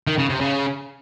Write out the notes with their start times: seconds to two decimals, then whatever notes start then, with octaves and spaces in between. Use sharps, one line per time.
0.07 D#3
0.18 C#3
0.30 C3
0.41 C#3